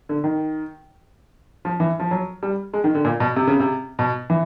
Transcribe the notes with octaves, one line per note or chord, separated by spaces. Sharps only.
D3
D#3
F3
E3
F3
F#3
G3
G#3
D#3
D3
A#2
B2
C3
C#3
C3
B2
E3